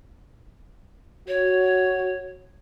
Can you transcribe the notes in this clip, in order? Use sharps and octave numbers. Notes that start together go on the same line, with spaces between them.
F#4 C#5